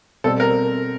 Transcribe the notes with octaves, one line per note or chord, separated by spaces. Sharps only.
B2 G3 C4 A4
A#4